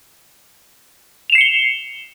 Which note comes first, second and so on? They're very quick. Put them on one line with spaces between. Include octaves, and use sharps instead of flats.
F7 E7 C7 C#7 G7